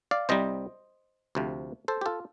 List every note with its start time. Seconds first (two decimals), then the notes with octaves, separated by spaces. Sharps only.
0.11 D5 F5
0.29 C2 C3 G3 C5 D#5
1.35 D2 C3 F3
1.88 A4 C5
2.01 G4
2.06 F4 A4